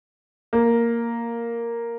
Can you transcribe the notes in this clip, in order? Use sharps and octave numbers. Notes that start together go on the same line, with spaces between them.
A#3